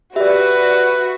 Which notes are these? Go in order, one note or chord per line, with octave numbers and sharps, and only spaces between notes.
F#4 G4 B4 D5 E5